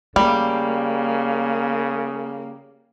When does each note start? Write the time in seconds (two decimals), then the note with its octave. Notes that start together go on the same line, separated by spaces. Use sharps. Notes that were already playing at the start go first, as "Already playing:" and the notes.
0.16 C#3 G3 A3 A#3